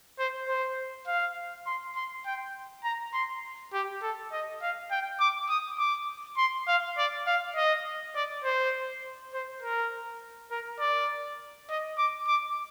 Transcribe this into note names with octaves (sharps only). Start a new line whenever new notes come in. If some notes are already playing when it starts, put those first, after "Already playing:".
C5
C5
F5
C6
C6
G5
A#5
C6
G4
A4
D#5
F5
G5
D6
D#6
D6
C6
F5
D5
F5
D#5
D5
C5
C5
A#4
A#4
D5
D#5
D6
D6